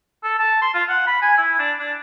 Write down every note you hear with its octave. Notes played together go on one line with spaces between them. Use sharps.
A4
A5
C6
F4
F#5
B5
G#5
E4
D4
D4